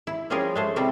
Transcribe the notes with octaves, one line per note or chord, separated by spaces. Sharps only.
E4
F3 G3 C#4 F4 G#4 A#4
G#3 A3 C5
C3 G3 C4 E4 F4